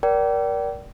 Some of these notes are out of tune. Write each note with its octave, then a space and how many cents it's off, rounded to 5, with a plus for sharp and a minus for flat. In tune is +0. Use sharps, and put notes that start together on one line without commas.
A#4 +20 D5 -20 G5 -30